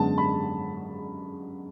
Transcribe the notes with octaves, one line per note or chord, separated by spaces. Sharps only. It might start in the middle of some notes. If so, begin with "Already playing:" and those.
Already playing: F#2 D3 G#3 B3 A5
B5